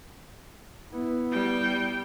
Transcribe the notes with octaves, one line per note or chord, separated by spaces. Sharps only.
B3 E4
G3 G5